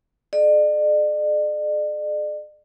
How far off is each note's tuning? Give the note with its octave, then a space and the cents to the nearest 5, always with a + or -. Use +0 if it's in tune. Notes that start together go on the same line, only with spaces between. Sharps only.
G#4 +40 D5 +40